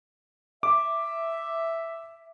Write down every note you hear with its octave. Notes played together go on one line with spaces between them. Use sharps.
E5 D6